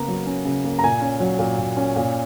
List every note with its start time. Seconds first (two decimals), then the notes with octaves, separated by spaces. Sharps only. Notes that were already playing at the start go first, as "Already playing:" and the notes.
Already playing: C#3 A#3 B3 A#5
0.08 F#3
0.27 C#4
0.45 C#3
0.64 A#3
0.79 A#5
0.84 A#2 G#5
1.01 C#4
1.20 F#3
1.39 A#2
1.58 A#2
1.77 C#4
1.96 A#2